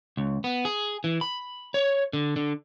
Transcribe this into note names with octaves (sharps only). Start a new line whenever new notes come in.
C#2
B3
G#4
E3
B5
C#5
D3
D3